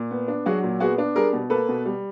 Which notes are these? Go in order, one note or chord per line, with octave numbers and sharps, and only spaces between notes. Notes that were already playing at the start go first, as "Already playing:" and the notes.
Already playing: A#2
B3
D4
F#3 F#4 G#4
A#2
B3 F#4 G#4
D4
G3 G#4 A#4
B2
A#3 A4 B4
B2
G3